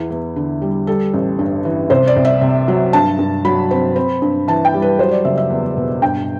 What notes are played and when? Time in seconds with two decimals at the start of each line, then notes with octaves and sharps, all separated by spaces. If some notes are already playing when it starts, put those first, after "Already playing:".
Already playing: E2 B3 E4
0.10 E2
0.36 D3
0.62 G3
0.87 G3 A4
1.14 A1
1.39 G2
1.65 E3
1.90 C2 C5
2.07 D5
2.17 C2
2.25 E5
2.41 C3
2.68 F#3
2.93 G2 A5
3.19 G2
3.45 F#3 B5
3.71 C4
3.96 C4
4.22 G2
4.48 E3 A5
4.65 G5
4.74 G3
4.82 B4
4.99 F#3 C5
5.11 D5
5.25 F#1 E5
5.38 E5
5.50 E2
5.77 B2
6.02 G2 G5